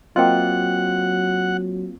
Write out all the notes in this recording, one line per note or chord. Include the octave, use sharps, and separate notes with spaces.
F#3 A#3 C4 F4 D#5 F#5 G5